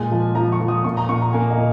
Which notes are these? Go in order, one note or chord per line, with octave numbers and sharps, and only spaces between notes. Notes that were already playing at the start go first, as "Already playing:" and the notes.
Already playing: A#2 G#3 G#5
F3
F3 A#5
C#6
F3
D#6
A#2 C#6
A#5
A#2 C#6
A#5
A#3 G#5
D#5
A#2